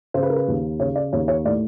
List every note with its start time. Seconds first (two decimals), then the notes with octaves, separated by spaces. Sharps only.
0.14 C#3 C5
0.23 B4
0.30 A#4
0.36 B4
0.48 D#2
0.79 C#3 C#5
0.96 D5
1.13 D#2 C#5
1.28 C#5
1.45 A2 D5